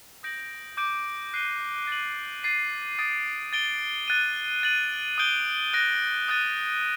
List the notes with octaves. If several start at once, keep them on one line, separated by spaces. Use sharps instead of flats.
D#6 G6 A#6 D7 F#7
D6 G6 D7
F#6 C7 D#7 G7
A6 D#7 F#7
A6 C7 D#7
D#6 A6 D7
A6 D7 G7
F#6 A6 D#7
A6 D#7 F#7
D#6 G6 D7 G7
F#6 A#6 D7 G7
D#6 F#6 A6 D#7